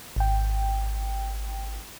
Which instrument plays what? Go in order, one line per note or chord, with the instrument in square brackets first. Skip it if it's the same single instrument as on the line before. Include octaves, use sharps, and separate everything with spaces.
[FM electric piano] G#1 G5